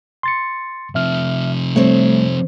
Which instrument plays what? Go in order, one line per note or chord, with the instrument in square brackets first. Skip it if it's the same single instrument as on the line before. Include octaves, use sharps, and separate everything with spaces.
[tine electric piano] C6 A6 C#7
[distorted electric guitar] C3 F3 [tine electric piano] E5 F6
[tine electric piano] G3 A3 [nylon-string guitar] C4 C#5